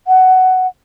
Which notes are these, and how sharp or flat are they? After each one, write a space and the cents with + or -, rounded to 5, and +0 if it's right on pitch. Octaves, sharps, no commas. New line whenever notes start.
F#5 +10